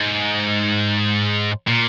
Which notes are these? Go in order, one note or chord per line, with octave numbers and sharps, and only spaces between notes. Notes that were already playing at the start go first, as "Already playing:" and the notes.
Already playing: G#2
A#2